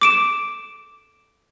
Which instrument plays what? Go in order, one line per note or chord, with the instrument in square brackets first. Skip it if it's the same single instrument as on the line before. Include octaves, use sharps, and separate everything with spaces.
[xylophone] D6 D7 E7